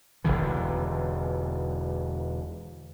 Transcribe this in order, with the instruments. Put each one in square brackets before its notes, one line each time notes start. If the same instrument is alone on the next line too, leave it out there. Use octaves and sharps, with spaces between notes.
[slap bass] E1 D2 D3 E3